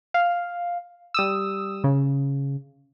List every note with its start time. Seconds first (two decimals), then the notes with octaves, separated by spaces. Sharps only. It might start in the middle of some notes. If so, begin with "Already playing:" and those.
0.14 F5
1.14 G3 D#6 E6
1.84 C#3